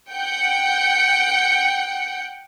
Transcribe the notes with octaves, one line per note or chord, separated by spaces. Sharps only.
F#5 G5 G6 C#7